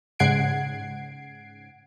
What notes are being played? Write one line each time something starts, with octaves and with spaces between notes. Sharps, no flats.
G#2 C#3 F#5 G#6 C7 D7